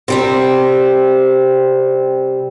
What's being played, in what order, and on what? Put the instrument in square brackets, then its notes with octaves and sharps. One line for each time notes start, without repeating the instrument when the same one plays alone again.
[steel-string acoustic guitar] C3 G3 C4